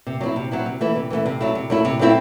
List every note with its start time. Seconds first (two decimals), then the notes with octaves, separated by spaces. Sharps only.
0.07 C3
0.21 F#3 C4 E4
0.36 C3
0.51 F#3 C4 E4
0.66 C3
0.81 E3 A3 E4
0.96 C3
1.10 E3 A3 E4
1.26 C3
1.40 F#3 A3 E4
1.55 C3
1.70 F#3 A3 E4
1.85 C3
1.99 F#3 A3 C4 E4